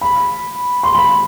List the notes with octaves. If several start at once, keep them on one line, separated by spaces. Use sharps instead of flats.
B5
C6
B5